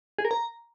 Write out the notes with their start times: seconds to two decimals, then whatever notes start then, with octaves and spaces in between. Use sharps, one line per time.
0.18 G#4
0.25 A#4
0.31 A#5